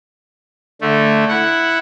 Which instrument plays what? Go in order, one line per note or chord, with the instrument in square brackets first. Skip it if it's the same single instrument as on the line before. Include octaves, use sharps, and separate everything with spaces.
[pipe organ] D3 A3
E4 F#5